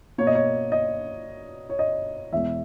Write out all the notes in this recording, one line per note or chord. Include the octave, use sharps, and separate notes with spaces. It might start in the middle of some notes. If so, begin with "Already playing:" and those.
B2 A#3 C#5
D#5
C#5
D#5
C#5
D#5
E2 B2 G#3 E5